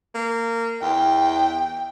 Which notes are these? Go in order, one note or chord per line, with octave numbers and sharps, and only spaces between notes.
A#3
E2 G5